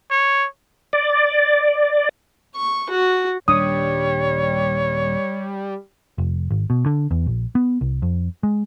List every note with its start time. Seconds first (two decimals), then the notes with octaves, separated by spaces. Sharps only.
0.11 C#5
0.93 D5
2.56 C#6
2.91 F#4
3.48 D#1 G3 D4 C#5 D#6
6.18 F1
6.51 G#1
6.70 B2
6.86 D3
7.11 E2
7.26 A#1
7.55 B3
7.81 C2
8.02 F2
8.43 G#3